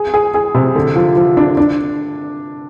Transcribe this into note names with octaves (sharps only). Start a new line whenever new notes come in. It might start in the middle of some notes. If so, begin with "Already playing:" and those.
Already playing: G#4
G#4
G#4
C3
D3
F3
F3
D4
D4